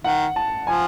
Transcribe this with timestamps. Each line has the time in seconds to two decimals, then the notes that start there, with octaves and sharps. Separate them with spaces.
0.04 D#3 F#5
0.36 A5
0.67 F3 G#5